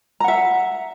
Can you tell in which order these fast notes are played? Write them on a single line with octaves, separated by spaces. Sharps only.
A#5 F#5 E5